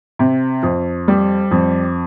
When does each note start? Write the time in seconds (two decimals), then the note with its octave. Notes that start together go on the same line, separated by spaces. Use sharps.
0.19 C3
0.63 F2
1.08 G3
1.51 F2